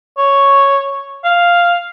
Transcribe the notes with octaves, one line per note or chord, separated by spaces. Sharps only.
C#5
F5